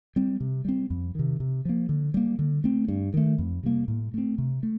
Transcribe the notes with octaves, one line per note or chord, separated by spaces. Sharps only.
G3 C4
C3
G3 C4
F2
C3 D#3
C3
F3 A#3
D3
G3 A#3
D3
A3 C4
G2
D#3 A3
F2
C3 G3 A#3
A2
A3 C4
C3
A3